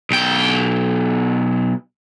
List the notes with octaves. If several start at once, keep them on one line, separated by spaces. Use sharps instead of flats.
B1 G5